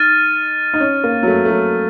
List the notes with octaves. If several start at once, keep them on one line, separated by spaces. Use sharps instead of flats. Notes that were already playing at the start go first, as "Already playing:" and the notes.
Already playing: D#4 F6 A6 D#7
D#4
C#4
A#3
F#3
A3
A3
F#3